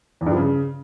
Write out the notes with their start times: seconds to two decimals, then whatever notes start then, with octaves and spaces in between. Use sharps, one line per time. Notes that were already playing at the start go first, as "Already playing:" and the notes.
0.21 E2
0.26 G2
0.32 F3
0.37 C#3